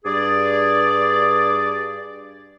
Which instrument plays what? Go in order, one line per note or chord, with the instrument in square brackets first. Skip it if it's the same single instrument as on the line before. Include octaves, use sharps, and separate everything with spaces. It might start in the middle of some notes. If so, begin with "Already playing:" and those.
[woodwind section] G2 G#4 D5